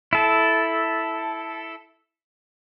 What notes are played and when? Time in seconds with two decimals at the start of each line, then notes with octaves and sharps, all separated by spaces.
0.13 E4 A4